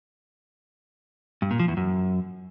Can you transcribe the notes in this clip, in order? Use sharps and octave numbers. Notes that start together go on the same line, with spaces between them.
G2
A#2
F3
E2
F#2